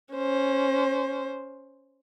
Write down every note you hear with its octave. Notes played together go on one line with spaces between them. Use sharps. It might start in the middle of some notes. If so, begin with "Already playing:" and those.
C#4 C5